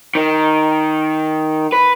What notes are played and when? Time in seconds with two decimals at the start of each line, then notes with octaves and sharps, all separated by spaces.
0.15 D#3
1.72 B4